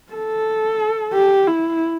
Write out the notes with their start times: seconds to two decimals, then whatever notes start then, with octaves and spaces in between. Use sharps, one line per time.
0.13 A4
1.14 G4
1.47 E4